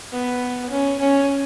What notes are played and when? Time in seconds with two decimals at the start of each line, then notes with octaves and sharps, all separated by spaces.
0.12 B3
0.70 C#4
0.99 C#4